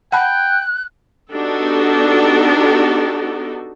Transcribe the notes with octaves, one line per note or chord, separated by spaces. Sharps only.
F#5 G5 A5 B5 F#6
B3 D4 D#4 F#4 G4 A4